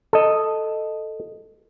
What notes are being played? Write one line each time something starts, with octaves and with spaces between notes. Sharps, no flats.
A4 D#5